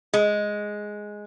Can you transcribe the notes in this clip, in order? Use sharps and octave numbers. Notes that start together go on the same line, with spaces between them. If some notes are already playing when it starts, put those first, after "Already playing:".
G#3